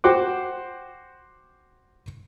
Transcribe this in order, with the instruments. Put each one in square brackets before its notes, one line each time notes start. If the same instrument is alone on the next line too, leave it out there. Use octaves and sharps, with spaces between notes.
[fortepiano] F#4 C5 F#5 G5 D6